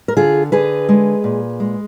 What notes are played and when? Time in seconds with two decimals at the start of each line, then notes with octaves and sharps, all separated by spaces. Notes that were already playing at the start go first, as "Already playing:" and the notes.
0.08 A#4
0.16 D3 F4 G#4
0.52 D3 G#4 B4
0.89 G#3
1.24 A#2
1.60 G#3